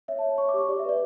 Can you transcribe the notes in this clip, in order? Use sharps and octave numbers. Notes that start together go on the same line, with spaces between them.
C#5 E5
A5
C#5
C#5 C#6
D6
G4 C#6
G4 D5
E5
B4 D5